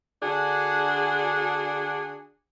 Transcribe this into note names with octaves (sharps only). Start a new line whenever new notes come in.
D3 D4 F#4 G#4